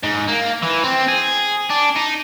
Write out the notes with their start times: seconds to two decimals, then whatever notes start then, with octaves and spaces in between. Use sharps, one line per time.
0.03 G#2
0.28 A#3
0.62 E3
0.84 C4
1.08 G#4
1.70 D4
1.96 D#4